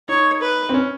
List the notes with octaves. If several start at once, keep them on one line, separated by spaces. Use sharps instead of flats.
D#4 C#5
B4
C4
C#4